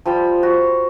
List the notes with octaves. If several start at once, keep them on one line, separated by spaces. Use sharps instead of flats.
F3 G3 C5 B5
F#4